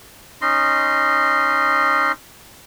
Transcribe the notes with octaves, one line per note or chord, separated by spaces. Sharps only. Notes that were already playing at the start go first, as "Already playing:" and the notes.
C#4 D#4 D#5 C6